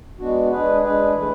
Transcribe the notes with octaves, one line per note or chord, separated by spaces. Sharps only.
G#3 B3 D4 F#4
G#3 D4 G#4 B4
G#3 D4 G#4 B4
E3 A3 E4 B4